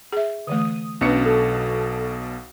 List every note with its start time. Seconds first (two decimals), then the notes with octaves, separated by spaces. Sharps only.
0.12 G#4 E5
0.47 D3 E3 A3 D#6
1.01 B1 B2 F#3 C#4 D4 B4 C#7
1.26 A4